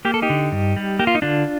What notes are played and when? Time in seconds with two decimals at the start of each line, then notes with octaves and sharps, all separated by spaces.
0.05 A#3 G4
0.14 A4
0.22 D#4 G4
0.30 D3
0.52 G2
0.76 G3
0.99 A#3 G4
1.07 F4
1.15 D#4
1.22 D3 D4 F4